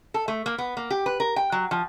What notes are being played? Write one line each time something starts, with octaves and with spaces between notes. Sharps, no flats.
A4
A3
A#3
B3
A#3
G4
B4
A#4
G5
F#3
F3